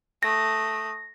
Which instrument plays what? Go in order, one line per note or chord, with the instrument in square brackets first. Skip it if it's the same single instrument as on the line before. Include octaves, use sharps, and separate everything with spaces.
[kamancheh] A3 D#6 [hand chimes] A#6